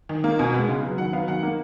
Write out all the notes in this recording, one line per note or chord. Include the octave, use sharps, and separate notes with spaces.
D#3
A#3
B2 G#5
G#3 B3
C#3
F#3 B3
D#3 F#5
F#3 B3 F5
D#3 F#5
A#3